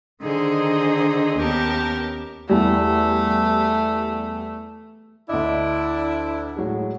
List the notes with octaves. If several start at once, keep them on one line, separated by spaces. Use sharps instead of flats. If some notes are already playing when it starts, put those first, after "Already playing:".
D3 D#3 D#4 G#4 C5
D#2 B3 C#4 G4 A#4 A5
E2 G3 A3
D2 D4 E4 D#5
A2 F#3 G#3